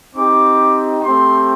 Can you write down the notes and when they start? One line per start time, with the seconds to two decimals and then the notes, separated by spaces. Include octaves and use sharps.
0.15 C4 D#4 G4 D6
1.03 A3 C4 G4 C6